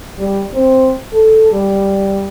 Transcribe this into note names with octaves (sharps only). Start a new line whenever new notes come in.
G3
C4
A4
G3